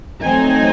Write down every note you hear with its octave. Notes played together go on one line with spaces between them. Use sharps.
F#3 A3 C4 D#4 G#5